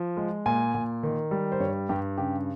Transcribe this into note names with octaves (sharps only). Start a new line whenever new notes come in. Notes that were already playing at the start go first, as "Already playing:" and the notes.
Already playing: F3
G#3
A#2 G#5
A#2
D#3
G3
C5
G2 C#5
G2 G4
C#3 G4